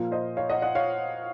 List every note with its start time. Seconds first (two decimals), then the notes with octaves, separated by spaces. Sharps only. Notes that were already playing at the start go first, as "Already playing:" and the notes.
Already playing: A#2 F3 A#3 F4
0.11 C5 D#5
0.37 C#5 F5
0.50 D#5 F#5
0.62 D#5 F#5
0.75 C#5 F5